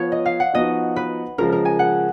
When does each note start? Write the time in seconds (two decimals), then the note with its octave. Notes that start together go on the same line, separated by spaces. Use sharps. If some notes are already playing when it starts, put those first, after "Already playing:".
Already playing: F3 B3 F4 B4 C#5
0.12 D#5
0.26 F5
0.40 F#5
0.54 F3 B3 D#4 F#4 D#5
0.96 B4
1.38 C#3 F3 G#3 A#4
1.52 A#4
1.65 G#5
1.79 F#5